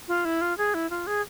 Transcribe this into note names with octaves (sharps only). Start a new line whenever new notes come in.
F4
E4
F4
G#4
E4
F4
G#4